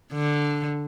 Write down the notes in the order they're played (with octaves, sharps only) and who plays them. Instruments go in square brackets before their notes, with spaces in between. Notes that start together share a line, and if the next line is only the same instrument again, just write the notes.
[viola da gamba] D3